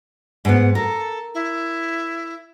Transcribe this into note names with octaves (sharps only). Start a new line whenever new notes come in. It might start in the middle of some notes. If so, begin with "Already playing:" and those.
G#2 B3 F#5
A4 A#4
E4